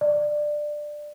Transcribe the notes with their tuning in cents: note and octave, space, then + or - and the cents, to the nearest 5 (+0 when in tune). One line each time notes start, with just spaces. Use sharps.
D5 +15